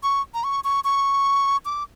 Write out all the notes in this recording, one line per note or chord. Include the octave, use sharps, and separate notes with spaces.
C#6
A#5
C#6
C#6
C#6
D6